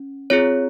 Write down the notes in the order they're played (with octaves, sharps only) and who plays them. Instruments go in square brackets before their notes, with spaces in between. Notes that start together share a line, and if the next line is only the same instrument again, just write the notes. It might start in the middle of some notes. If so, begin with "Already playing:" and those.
Already playing: [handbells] C#4
C4 F4 G#4 C#5